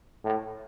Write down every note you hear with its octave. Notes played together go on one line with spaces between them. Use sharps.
A2